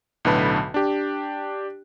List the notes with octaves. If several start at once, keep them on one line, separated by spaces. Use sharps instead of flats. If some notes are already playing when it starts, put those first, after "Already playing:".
B1 A2 D3 B4 A5 B5
D4 G4